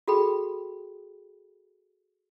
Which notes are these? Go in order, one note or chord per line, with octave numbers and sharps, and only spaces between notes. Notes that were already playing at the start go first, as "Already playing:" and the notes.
F#4 G#4 A4 G5 B5